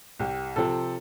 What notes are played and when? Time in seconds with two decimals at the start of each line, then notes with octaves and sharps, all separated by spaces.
0.19 C2 G4
0.56 C3 F3 C4 A4